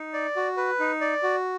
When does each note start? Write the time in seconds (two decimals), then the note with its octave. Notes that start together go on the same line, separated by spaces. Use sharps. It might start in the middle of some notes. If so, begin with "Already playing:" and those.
Already playing: D#4
0.13 D5
0.36 F#4
0.57 B4
0.80 D#4
1.01 D5
1.23 F#4